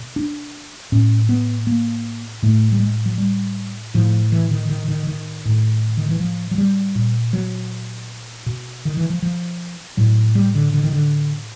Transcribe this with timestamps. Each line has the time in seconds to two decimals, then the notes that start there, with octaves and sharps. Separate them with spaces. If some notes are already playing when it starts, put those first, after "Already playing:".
Already playing: B2
0.16 D4
0.92 A2 C#4
1.29 B3
1.67 A#3
2.43 A2 A3
2.72 G3
2.80 G#3
3.06 F#3
3.18 G3
3.94 A2 F3
4.32 E3
4.51 D#3
4.70 D#3
4.88 D#3
5.07 D#3
5.45 A2
5.97 D#3
6.09 E3
6.20 F3
6.51 F#3
6.58 G3
6.95 A#2
7.33 F#3
8.46 B2
8.85 D#3
8.97 E3
9.10 F3
9.22 F3
9.97 A2 F#3
10.35 G3
10.55 D3
10.74 D3
10.84 D#3
10.92 D3